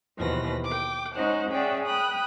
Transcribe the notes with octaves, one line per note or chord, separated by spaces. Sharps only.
D#2 B2 E3 F3 B4 A#6
G5 D6
G#3 C#4 D#4 C5 F#5
C#4 G#4 D5 E5 F#5 G5
G5 B5 D#6 F#6